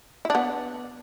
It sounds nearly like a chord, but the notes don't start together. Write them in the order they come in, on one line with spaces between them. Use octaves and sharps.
E4 D4 B3